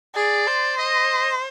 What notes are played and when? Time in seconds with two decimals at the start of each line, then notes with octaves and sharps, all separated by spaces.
0.15 G#4 D5
0.47 C5
0.78 D#5